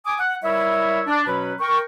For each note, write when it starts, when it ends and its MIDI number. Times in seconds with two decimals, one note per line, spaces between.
0.06 0.15 80
0.06 0.15 86
0.06 0.15 87
0.20 0.36 78
0.44 1.01 55
0.44 1.01 64
0.44 1.01 70
0.44 1.01 73
0.44 1.01 76
1.07 1.23 62
1.27 1.53 47
1.27 1.53 54
1.27 1.53 61
1.27 1.53 71
1.60 1.80 70
1.60 1.80 79
1.60 1.80 85